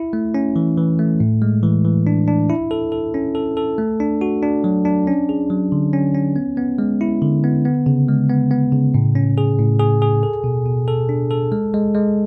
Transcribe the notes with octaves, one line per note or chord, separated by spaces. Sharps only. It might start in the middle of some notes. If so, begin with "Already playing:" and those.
Already playing: E4
A3
C#4
E3
E3
A3
A2
G#3
E3
E3
D4
D4
E4
A4
A4
C#4
A4
A4
A3
D4
F#4
D4
F#3
D4
C#4
G#4
F#3
D3
C#4
C#4
B3
B3
G#3
E4
D3
B3
B3
C#3
G#3
B3
B3
C#3
A2
C#4
G#4
A2
G#4
G#4
A4
B2
B2
A4
D4
A4
G#3
G#3
G#3